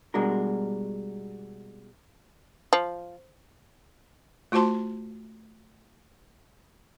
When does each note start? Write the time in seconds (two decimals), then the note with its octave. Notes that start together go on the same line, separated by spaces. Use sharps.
0.14 B2 G3 G#3 D4 F#4 A#4
2.73 F3
4.52 A3 F4 F#4 C5 A5 C6